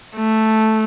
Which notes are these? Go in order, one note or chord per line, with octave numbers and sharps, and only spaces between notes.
A3